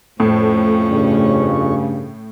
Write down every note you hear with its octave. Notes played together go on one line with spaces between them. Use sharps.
F2 A2 A3 C#4 C#6
G2 C#3